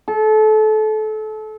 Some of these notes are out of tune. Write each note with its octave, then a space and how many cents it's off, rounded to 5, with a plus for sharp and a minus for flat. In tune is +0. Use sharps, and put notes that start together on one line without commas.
A4 -30